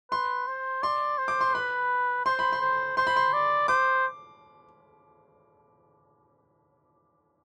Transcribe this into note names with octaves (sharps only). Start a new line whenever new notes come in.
B4 C6
C5
D5 C6
C5
D6
C6
B4 B5
C5 C6
B5
C6
C5
C5 C6
B5
C6
D5
C5 D6